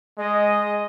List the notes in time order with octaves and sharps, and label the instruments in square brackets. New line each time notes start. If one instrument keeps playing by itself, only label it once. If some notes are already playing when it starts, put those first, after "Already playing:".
[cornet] G#3 [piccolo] D#5